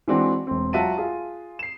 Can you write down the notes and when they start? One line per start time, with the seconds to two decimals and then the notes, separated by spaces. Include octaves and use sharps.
0.08 E3 G#3 C4 D4 F#4
0.47 E1 C4
0.73 F#3 F4 F#4 E5 A5 D#7
0.98 F4 G#4
1.59 C7 E7